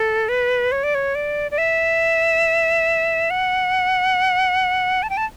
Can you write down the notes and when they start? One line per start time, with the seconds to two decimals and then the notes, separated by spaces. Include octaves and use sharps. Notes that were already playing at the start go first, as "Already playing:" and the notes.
Already playing: A4
0.29 B4
0.72 C#5
0.84 D5
0.95 C#5
1.15 D5
1.51 D5
1.58 E5
3.30 F#5
5.03 A5
5.10 G5
5.17 A5